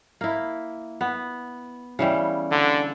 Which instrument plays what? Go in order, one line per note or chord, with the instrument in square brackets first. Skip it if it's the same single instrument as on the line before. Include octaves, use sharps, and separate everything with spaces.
[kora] A#3 E4
B3
C#3 E3 G3
[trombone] D3